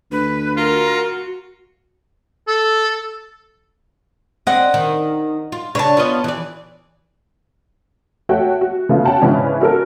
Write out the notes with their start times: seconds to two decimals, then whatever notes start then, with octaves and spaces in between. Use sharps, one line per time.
0.11 D2 B4
0.57 F4 F#4 A#4
2.48 A4
4.47 C4 D4 D#5 F#5
4.74 D#3
5.52 F4
5.75 C#3 D4 B4 C#5 A5
5.97 B3 F4 D#5
6.24 E3 D5
8.29 A3 F#4 C#5 E5 F#5 G5
8.61 F#4
8.89 C#3 A3 B3 F4
9.05 F#4 C#5 F#5 G5 A5
9.21 G#2 C#3 E3 C#4 D4
9.61 F#4 A4 A#4